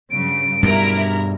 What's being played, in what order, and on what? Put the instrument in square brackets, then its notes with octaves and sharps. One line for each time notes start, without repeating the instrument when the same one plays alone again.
[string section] G2 C#3 F#3 [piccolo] D7
[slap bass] G2 B2 G3 [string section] E4 A#4